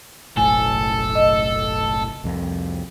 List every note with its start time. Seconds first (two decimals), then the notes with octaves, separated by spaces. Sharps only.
0.37 F#1 B1 A2 A4 G#5
1.15 D#5
2.24 C2 F2